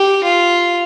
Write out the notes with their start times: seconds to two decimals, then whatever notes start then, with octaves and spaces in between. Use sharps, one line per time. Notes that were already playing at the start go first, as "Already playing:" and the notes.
Already playing: G4
0.24 F4